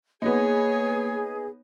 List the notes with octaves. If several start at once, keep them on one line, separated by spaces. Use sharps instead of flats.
A#3 B3 D#4 G#4 C#5 G#5